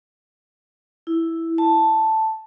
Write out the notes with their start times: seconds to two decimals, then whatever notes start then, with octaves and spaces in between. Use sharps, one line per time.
1.07 E4
1.58 A5